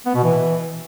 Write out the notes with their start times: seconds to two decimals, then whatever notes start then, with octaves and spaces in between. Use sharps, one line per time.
0.06 B3
0.15 B2
0.23 E3